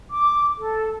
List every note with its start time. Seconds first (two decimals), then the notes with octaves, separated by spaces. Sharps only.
0.11 D6
0.59 A4